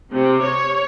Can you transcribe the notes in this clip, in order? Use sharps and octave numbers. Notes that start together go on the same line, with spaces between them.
C3
C#5